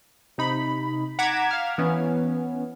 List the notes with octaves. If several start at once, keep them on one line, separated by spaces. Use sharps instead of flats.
C3 D#4 B5
F#5 A#5 D6 G#6 B6 E7
F5 F6
E3 B3 C#4